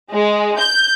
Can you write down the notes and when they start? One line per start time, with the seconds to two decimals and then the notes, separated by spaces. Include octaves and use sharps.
0.11 G#3
0.59 G6